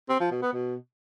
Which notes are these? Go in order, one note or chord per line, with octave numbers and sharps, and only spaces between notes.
C4
F3
B2
B3
B2